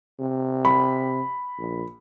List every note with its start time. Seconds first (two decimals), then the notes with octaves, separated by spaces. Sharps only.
0.20 C3
0.65 B5
1.59 A#1